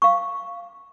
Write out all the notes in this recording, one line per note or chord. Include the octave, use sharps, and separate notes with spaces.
F5 C#6